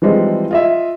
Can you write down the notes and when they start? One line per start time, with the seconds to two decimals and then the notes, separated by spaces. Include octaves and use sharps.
0.02 E3 F3 G3 G#3 C4 D#4
0.51 F4 D#5 E5